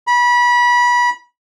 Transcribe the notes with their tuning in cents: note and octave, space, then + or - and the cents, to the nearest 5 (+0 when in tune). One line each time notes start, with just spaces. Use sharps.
B5 -25